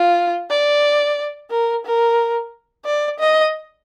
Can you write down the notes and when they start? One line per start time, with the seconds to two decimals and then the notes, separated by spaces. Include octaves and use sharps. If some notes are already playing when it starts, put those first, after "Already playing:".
Already playing: F4
0.50 D5
1.51 A#4
1.85 A#4
2.85 D5
3.19 D#5